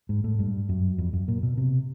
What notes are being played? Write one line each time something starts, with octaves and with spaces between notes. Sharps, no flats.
G#2
A2
G2
F#2
F2
F#2
A#2
B2
C3